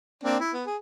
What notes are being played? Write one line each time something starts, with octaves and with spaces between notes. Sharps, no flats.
A#3 C4 D4
E4
B3
G#4